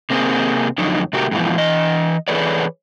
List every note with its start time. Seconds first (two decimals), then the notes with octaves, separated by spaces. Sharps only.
0.10 C3 A#3 C4 C#4 G#4 C5
0.78 F2 D3 F#3 D#4
1.13 C3 A3 F#4 G4 A#4
1.31 F2 G#2 B2 E3 F3
1.57 E3 D#5
2.28 E3 G#4 A4 B4 C#5 D5